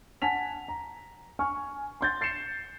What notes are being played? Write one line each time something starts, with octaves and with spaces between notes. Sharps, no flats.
F#5 G#5 A5 B6 F7
A#5
G#5 C#6 F6
C6 G6 A6
A6 C7 C#7 E7